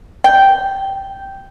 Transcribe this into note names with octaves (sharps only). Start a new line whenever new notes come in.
G5